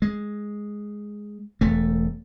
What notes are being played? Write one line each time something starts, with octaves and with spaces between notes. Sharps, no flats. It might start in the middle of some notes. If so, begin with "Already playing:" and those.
G#3
E1 A3